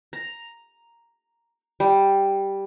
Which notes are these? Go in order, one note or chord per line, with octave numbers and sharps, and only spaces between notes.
A#5
G3